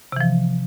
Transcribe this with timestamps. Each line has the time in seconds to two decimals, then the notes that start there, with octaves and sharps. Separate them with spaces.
0.12 C3
0.16 E3
0.21 F3